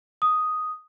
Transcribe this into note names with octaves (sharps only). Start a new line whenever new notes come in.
D#6